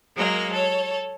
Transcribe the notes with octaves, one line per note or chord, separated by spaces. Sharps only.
F#3 G#3 A#3 A#4
A4 C#5